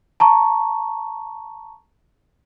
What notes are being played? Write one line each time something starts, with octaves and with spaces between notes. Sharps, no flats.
A5 A#5 C#6